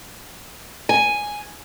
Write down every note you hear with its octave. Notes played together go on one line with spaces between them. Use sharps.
G#5